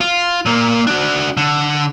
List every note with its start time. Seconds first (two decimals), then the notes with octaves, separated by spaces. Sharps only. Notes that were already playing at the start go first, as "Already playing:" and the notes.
0.01 F4
0.46 A#2 A#3
0.87 D4 F#4
1.37 D3